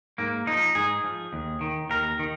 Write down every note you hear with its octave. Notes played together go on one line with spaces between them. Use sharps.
G#2 A#3
F3 D#4
G#2 G#4
F3
D#2
D#3
D#2 A#4
D#3